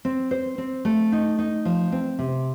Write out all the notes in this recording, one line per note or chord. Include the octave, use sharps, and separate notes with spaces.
C4
C5
C4
A3
D#4
D#4
F3
C4
C3